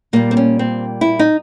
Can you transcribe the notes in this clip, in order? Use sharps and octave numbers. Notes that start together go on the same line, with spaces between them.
A#2 G3 A#3
C4
C#4
C4
E4
D#4